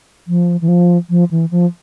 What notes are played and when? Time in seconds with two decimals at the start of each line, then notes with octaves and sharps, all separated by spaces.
0.27 F3
0.61 E3
0.68 F3
1.10 F3
1.31 E3
1.51 F3